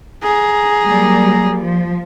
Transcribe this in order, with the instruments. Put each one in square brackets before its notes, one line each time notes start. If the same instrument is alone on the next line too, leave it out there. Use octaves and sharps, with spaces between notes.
[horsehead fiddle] G#4 A#5
[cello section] F#3 G3 A#3
F3